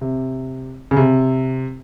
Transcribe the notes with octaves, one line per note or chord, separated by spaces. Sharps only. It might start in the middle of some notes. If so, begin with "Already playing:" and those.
C3
C#3
C3